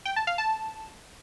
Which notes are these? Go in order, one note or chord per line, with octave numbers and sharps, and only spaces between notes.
G5
A5
F5
A5